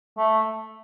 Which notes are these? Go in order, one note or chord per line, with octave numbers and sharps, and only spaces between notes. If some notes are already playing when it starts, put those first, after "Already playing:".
A3